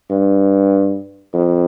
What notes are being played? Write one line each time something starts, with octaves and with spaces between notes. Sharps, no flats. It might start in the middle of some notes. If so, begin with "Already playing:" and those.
G2
F2